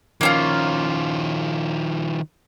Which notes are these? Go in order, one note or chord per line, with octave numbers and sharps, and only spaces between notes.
D#3 F3 A#3 C#4 F4